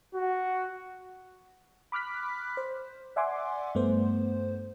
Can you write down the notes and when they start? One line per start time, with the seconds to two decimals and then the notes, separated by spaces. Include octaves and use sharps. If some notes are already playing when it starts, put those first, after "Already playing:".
0.15 F#4
1.92 B5 D6 F6 F#6 B6
2.57 C5
3.16 D5 E5 F#5 G#5 C6 D6
3.75 G2 A3 B3 C5